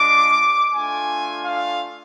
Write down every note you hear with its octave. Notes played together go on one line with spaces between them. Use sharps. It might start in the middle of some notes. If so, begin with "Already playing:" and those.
Already playing: G#3 D4 F4 D6
A3 D4 F4 G#5
F5